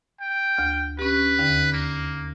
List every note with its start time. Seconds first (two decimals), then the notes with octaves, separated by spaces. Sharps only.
0.21 G5
0.57 D2 F6
0.99 C#4 G4 B4
1.39 D#2 D3 F5
1.73 A#3